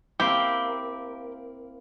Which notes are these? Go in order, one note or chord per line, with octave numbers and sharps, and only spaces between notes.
A#3 C4 E4 G4